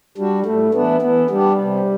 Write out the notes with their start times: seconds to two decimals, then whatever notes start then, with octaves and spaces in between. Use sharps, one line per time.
0.17 G3 D4 F#4
0.45 A2 A3
0.74 E3 A3 B3 D4
1.02 E3 B3
1.30 G3 B3 D4 G4
1.58 C3